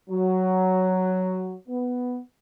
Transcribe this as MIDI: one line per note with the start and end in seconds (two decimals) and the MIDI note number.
0.10 1.54 54
1.68 2.19 59